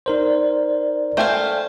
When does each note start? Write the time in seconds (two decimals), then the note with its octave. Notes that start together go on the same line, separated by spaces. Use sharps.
0.06 D#4 A#4 C5 D5
1.17 A3 C5 F5 G5 G#5